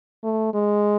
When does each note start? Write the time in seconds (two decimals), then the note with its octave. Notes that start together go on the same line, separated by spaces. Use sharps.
0.24 A3
0.54 G#3